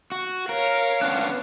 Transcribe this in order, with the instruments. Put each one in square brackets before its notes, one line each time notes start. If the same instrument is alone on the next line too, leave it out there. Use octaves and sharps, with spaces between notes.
[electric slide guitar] F#4
[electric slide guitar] A#4 [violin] C#5 F5
[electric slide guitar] B3 C#4 D4 [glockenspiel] F#6